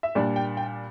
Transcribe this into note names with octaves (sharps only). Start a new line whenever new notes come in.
E5
A#2 G3 D4 D5
G5
G5